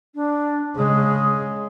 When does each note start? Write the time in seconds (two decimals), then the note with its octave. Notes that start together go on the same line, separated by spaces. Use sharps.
0.15 D4
0.76 C#3 G#3 G#4